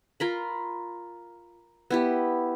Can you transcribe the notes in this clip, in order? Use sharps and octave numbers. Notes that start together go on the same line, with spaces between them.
F4 A#4 B5
B3 E4 G4